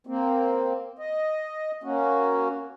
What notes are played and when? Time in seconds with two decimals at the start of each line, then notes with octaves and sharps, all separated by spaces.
0.07 A#3 C4
0.99 D#5
1.83 A#3 C#4 F#4